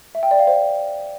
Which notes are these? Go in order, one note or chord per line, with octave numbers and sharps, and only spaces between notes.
E5
G5
D5
F5
C5